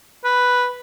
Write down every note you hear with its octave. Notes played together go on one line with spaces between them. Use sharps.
B4